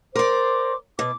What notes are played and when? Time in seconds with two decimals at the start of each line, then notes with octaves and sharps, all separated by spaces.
0.15 A#4 C5 D5 C6 D6
0.99 B2 D6